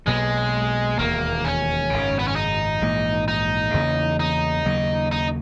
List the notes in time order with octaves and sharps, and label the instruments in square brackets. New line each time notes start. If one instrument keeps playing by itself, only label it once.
[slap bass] B1 B2 A#3 [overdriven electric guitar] G#3
[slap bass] E1 D#2 D#3 [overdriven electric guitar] A#3
[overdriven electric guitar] C#4
[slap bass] G#1 F#2 C#3
[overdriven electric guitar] B3
C#4
D#4
[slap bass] A#1 G#2 E3 A#3
[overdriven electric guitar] D#4
[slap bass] E2 C#3 E3 A#3
[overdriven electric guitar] D#4
[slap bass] D#2 C#3 F#3 A#3
[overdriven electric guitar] D#4